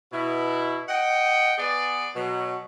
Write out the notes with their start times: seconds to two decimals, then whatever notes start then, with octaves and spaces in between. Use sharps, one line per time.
0.13 B2 E4
0.89 D#5 F#5 G5
1.58 B3 G#4 D5
2.16 B2 F#3